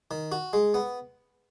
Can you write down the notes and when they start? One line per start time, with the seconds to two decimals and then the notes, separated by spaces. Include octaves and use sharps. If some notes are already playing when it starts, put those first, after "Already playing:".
0.11 D#3
0.32 F#4
0.53 G#3
0.74 B3